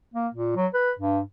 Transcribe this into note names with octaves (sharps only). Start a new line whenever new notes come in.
A#3
A#2
F#3
B4
G2